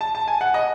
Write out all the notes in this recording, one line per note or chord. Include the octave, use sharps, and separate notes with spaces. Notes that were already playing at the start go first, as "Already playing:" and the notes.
A5
A5
G#5
F#5
D#5